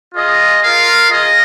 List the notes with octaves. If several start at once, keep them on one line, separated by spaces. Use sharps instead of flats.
F4 G#4 D#5
F4 A#4 F5
F4 G#4 D#5